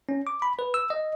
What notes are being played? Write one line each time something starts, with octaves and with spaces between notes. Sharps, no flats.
C#4
D6
B5
B4
E6
D#5